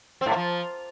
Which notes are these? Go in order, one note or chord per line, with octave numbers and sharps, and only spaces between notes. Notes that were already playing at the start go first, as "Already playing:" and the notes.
C4
A2
A#3
F3